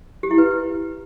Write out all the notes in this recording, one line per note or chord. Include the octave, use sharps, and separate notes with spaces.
G4
E4
B4